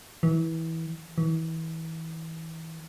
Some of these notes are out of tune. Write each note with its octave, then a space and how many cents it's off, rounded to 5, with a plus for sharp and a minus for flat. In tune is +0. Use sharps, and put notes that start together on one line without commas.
E3 -20
E3 -30